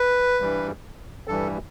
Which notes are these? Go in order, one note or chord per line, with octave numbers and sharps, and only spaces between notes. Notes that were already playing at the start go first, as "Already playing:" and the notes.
Already playing: B4
G2 E3 G3
G2 E3 G3 A4